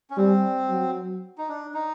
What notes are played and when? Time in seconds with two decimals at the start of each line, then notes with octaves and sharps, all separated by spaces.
0.10 C#4
0.17 G3 C4
0.69 F#3
1.38 D#4
1.48 D4
1.74 D#4